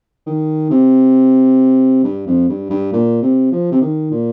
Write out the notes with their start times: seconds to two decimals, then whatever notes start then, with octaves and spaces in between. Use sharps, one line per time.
0.26 D#3
0.71 C3
2.04 G2
2.27 F2
2.49 G2
2.70 G2
2.93 A#2
3.22 C3
3.52 F3
3.72 C3
3.81 D#3
4.11 A#2